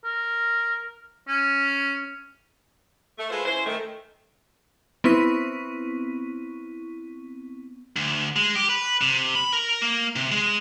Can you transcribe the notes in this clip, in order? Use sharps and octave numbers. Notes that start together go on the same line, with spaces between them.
A#4
C#4
A3
G#3 F4 A4 B4 C5
C#4 E4 C5
D#3 A3
B3 C4 E4 C#6 B6 D#7
D2
G#3
G4
B4
C3
B5
A#4
A#3
C3
G#3